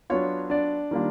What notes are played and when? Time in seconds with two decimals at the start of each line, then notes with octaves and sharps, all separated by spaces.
0.10 F#3 B3 D4 F4 C#5
0.50 D4 D5
0.91 D#3 G3 A#3 D4 F4